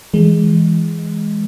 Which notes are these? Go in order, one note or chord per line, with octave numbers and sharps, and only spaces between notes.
E3 G#3
E3